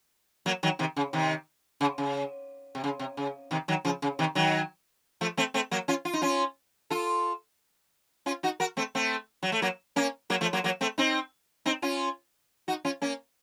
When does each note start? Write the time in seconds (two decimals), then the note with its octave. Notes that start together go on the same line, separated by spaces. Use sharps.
0.46 F#3 A#3
0.63 D#3 F#3
0.79 C3 D#3
0.96 C#3
1.13 C3 D#3
1.81 C#3
1.98 C#3
2.75 C3
2.84 C#3
2.99 C3
3.17 C#3
3.51 C3 D#3
3.68 D#3 F#3
3.85 C#3 F3
4.02 C#3
4.19 C3 D#3
4.35 D#3 F#3
5.21 F3 A3
5.37 A3 C4
5.54 A3 C4
5.71 F#3 A#3
5.88 C#4 F4
6.05 F4
6.13 D#4
6.22 C#4 F4
6.90 F4 A4
8.26 C#4 F4
8.43 D#4 F#4
8.60 F#4 A#4
8.77 A3 C4
8.95 A3 C4
9.43 F#3
9.52 A3
9.62 F#3 A#3
9.96 A#3 C#4
10.30 F#3 A#3
10.41 F3 A3
10.53 F#3 A#3
10.64 F#3 A#3
10.81 A3 C4
10.98 C4 D#4
11.66 C4 D#4
11.82 C#4 F4
12.68 D#4 F#4
12.85 C#4 F4
13.02 A#3 C#4